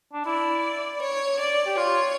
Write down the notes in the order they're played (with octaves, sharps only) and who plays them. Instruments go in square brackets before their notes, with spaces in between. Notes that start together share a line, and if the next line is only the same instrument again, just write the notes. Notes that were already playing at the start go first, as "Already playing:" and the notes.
[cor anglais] D4
[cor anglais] E4 [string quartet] D5
[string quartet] C#5
D5
[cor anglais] G4
[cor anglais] F4 [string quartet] C#5